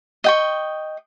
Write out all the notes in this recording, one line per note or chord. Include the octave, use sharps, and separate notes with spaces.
D#5 G5 C#6